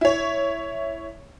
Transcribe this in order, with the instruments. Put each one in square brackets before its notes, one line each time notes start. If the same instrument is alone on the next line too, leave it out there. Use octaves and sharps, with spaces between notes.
[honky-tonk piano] E4 C#5